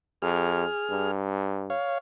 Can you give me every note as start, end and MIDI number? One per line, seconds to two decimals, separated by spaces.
0.22 0.65 41
0.22 1.11 68
0.22 1.11 89
0.90 1.71 43
1.70 1.98 73
1.70 1.98 77